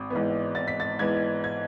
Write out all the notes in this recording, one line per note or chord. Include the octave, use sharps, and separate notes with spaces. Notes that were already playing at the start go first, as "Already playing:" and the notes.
Already playing: G#1
G#2 E3 B3
G#1 A6
B6
A6
G#2 E3 B3 G#6
G#6